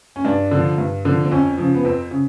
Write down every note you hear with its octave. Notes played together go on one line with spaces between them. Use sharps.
C#4
G2 D4
D3 F3
G2
D3 F3
C4
F2 C#4
C#3 F3
B3
F2 C4
C#3